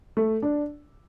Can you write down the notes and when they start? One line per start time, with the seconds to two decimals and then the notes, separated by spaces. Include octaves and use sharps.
0.17 A3
0.42 D4